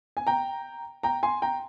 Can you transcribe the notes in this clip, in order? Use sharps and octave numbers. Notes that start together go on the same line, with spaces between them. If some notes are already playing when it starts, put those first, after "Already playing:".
G#5
G5 A#5
G5 A#5
G#5 C6
G5 A#5